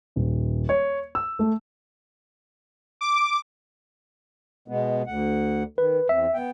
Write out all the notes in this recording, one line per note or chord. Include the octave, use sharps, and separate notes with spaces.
D#1
C#5
E6
A3
D6
B2 G#3 B3
D2 F#5
D#3 B4
E2 C4 E5
B3 G5